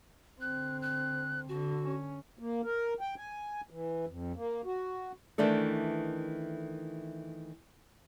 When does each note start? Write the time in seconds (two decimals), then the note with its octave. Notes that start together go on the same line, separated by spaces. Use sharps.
0.41 D3 C4 F#6
0.82 F#6
1.49 D3 F#4
1.84 C#4
2.39 A#3
2.64 A#4
3.01 G5
3.17 G#5
3.70 E3
4.07 F2
4.36 A#3
4.65 F#4
5.38 D#3 E3 A3 D4 A4